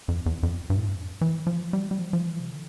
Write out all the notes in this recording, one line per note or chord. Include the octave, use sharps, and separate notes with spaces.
F2
E2
F2
G2
A2
G2
F2
E3
F3
G3
G3
F3
F3
E3
C3
D3